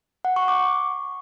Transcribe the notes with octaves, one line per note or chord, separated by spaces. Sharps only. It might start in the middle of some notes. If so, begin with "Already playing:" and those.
F#5
C#6
D6